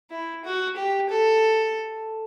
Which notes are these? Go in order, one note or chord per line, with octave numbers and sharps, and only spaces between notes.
E4
F#4
G4
A4